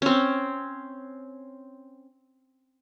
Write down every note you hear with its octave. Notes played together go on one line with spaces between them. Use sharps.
C4 C#4